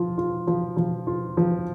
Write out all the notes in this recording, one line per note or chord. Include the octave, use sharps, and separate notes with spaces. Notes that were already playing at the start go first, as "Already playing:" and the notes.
Already playing: F3 F4
F4
F3
F3
F4
F3